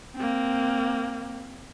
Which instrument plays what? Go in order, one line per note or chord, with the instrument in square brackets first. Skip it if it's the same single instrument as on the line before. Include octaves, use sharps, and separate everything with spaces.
[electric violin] A#3 C4